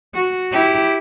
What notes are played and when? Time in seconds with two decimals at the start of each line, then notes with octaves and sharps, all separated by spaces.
0.14 F#4
0.52 E4 G4